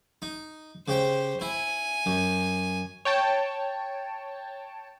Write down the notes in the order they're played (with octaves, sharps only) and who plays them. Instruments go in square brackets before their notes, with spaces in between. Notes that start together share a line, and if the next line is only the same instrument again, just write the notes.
[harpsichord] D#4
[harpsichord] C#3 G4 G5 [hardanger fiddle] C5
[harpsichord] E4 [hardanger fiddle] G#5
[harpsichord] F#2
[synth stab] C#5 G5 A5